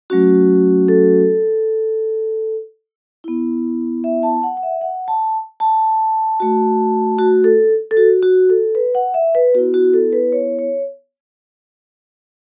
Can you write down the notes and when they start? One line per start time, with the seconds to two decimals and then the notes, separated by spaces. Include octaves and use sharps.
0.10 F#3 A3 C#4 F#4
0.88 A4
3.24 B3 E4
4.04 E5
4.23 A5
4.43 F#5
4.57 F#5
4.63 E5
4.81 F#5
5.08 A5
5.60 A5
6.40 A3 F#4
7.19 F#4
7.44 A4
7.91 A4
7.97 F#4
8.22 F#4
8.50 A4
8.75 B4
8.95 F#5
9.14 E5
9.35 B4
9.54 B3 E4 F#4
9.74 F#4
9.94 A4
10.13 B4
10.32 C#5
10.59 C#5